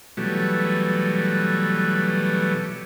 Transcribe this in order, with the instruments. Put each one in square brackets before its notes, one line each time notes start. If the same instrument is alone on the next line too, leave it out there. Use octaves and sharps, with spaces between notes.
[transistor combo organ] B2 E3 F#3 G3 A3